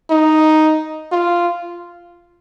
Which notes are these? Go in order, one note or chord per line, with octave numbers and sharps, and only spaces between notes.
D#4
F4